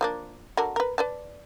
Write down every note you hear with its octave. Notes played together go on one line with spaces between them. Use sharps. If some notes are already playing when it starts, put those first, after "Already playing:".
F3 A#3 D4
D3 F#4 A#4
A#4 B4
B4 D5 A5